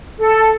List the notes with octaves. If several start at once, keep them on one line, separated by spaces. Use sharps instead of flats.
A4